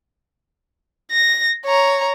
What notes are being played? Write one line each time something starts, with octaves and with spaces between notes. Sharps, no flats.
A#6
C#5 A#5